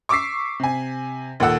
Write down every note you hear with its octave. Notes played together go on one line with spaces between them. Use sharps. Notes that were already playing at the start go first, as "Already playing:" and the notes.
C#6 D6 E6 B6 C7
C3 G#5
D#2 A#2 A4 F#5 E6